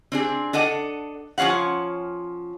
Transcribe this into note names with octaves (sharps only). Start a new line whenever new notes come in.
C4 D4 G#4
D4 A4 D#5 F#5
F3 C#4 C#5 F5 F#5